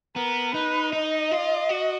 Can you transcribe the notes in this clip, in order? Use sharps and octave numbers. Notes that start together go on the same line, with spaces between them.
B3 A#4
D#4 B4
D#4 D#5
F4
F#4